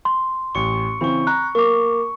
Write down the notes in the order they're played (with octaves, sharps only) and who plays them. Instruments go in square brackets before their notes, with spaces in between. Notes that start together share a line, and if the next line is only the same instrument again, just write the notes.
[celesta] C6
[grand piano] A1 [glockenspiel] C#6 C#7
[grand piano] C#3 E3 C4 [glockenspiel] B5 C#6
[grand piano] A#5 [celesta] F#6
[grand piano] A#3 [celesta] A#4 D6 [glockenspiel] C#6